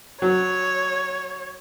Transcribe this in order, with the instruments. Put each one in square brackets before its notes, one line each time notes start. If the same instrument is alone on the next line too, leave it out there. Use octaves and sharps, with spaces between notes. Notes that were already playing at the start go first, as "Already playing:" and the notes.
[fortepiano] F#3 [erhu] C#5